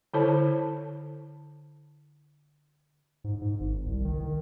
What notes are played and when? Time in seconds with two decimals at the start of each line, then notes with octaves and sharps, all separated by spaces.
0.14 D3 E4 A4 C5 C#5 A5
3.24 G#2
3.42 G#2
3.60 G#1
3.86 C2
4.05 D#3
4.20 D#3